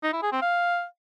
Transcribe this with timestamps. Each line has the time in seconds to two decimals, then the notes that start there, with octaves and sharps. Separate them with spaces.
0.03 D#4
0.13 E4
0.23 G#4
0.32 C4
0.42 F5